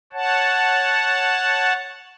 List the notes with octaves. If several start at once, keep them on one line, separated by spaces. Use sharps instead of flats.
C#5 F#5 A5